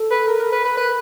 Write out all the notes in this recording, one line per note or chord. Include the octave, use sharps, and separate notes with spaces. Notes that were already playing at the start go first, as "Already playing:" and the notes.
Already playing: A4
B4
A#4
A#4
B4
B4
A#4 B4